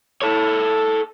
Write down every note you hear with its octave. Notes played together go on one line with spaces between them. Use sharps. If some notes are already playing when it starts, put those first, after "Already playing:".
A4 C#5